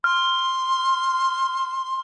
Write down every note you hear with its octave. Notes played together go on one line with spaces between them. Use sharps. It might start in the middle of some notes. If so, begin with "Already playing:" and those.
C6 F6